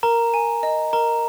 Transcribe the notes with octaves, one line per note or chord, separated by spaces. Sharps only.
A#4 A#5
G#5
D#5
A#4 A#5